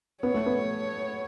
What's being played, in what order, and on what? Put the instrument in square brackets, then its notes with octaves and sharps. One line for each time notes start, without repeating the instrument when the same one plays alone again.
[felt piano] B3 [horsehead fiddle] C#5
[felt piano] A3
B3